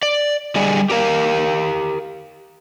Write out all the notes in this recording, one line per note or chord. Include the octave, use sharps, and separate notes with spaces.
D5
D3 G3 G#4 D5 D#5
G4 A#4 F5